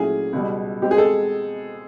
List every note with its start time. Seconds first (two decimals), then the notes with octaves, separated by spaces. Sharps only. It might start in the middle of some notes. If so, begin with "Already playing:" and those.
Already playing: A#2 F#3 A3 C#4 E4 G#4
0.33 C#2 B2 G3
0.81 B2 G#3 C4 G4
0.91 G#4
0.98 A4